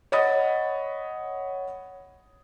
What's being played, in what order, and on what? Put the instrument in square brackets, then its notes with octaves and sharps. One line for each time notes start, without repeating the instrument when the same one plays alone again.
[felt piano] C#5 D#5 F#5 B5 D#6 A6